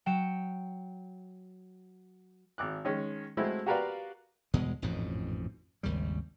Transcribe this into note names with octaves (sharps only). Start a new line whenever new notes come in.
F#3 G5 C#7 E7
G#1 D6 F#6
D#3 G#3 C#4
F#3 G#3 A3 C4 E4
F#4 G4 A#4 B4 D5 F5
G1 E2 B2 G#3
A1 F2 G#2 B2
G#1 D#2 C#3 G3